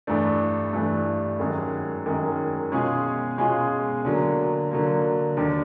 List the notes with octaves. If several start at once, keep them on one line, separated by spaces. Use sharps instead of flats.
G2 E3 A3 D4
G2 E3 A3 D4
F#2 D#3 G#3
F#2 D#3 G#3
B2 G#3 C#4 F4 G#4
B2 G#3 C#4 F4 G#4
D3 F#3 A#3
D3 F#3 A#3
D#2 D3 G3